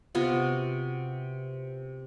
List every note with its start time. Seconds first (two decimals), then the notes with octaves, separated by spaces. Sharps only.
0.15 C3 B3 F4 F#4